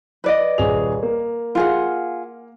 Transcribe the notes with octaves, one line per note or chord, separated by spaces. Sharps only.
B4 D5 D#5
D#1 G#4 F7
A#3
F4 G#4 F#5